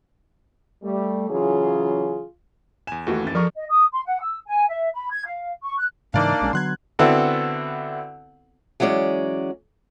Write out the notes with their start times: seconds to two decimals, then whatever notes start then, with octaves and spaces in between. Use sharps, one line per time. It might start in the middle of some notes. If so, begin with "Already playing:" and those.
0.83 G3 A3
1.29 C#3 E3 F#3 F4 G#4
2.87 E2 G#5 E7
3.07 D#2 E3 A3 F#4 A4
3.23 F#2 A6
3.35 F3 A4 A#4 A#5 C#6 F6
3.55 D#5
3.69 D#6
3.91 C6
4.05 F#5
4.20 E6
4.46 G#5
4.68 E5
4.93 B5
5.10 G#6
5.25 F5
5.63 C#6
5.77 F#6
6.14 G#2 C#3 E3 A#3 D4 D#4 D5 F5
6.41 A#1 G#3 C#4
6.53 D3 F#3 B3 C6 F#6 G#6
6.99 D3 B3 C4 E4 F#4 A4
8.80 E3 F#3 G#3 C#4 D5